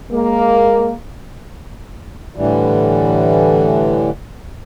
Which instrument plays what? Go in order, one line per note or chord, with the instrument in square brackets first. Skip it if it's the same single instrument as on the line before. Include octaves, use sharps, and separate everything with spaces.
[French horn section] G#3 A#3
[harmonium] A2 D3 E3 G3